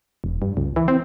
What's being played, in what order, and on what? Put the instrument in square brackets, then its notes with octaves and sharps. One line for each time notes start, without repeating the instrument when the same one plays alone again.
[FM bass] E1
G2
C#2
E3
C4